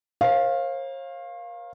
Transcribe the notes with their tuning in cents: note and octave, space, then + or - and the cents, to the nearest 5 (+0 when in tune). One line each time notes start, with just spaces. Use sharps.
A#4 +35 C#5 -45 F5 +0